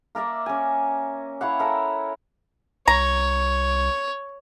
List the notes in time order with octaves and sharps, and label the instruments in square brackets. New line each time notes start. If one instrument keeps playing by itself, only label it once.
[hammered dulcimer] A#3 A#4 D5 E5
C#4 G#5
E4 C#5 F5 F#5
A4 A#4 E5
[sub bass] C2 [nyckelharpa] C#5 [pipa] A#5